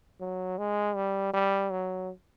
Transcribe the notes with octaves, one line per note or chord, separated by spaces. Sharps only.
F#3
G#3
G3
G3
F#3